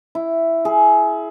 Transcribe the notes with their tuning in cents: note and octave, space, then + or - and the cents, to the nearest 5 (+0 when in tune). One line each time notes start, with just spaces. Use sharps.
E4 +5
G#4 +25